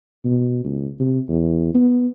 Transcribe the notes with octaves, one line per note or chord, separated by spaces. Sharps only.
B2
C#2
C3
E2
B3